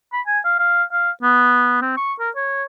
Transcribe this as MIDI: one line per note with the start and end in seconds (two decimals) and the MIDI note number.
0.13 0.21 83
0.27 0.40 80
0.44 0.59 77
0.59 0.83 77
0.92 1.11 77
1.23 1.79 59
1.82 1.96 60
1.97 2.13 85
2.19 2.30 70
2.35 2.63 73